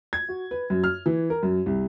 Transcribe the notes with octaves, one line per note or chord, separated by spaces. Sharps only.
G#6
F#4
B4
F#2
F6
E3
A#4
F#2
C2